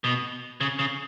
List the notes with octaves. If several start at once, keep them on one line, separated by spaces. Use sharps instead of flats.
B2
C#3
C#3